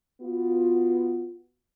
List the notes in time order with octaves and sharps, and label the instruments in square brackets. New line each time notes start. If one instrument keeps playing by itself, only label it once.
[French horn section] B3 F4 F#4